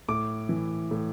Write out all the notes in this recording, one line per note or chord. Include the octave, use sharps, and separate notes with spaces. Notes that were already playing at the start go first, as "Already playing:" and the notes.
A2 D6
E3
A2